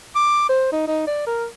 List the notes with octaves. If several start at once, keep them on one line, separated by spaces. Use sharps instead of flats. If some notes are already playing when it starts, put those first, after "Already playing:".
D6
C5
D#4
D#4
D5
A#4